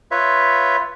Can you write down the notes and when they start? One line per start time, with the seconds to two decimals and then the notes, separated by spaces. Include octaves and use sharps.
0.11 F4 B4 C#5 E5